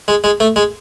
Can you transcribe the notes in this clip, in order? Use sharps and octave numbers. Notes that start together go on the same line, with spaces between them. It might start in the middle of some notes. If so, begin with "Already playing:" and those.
G#3
G#3
A3
G#3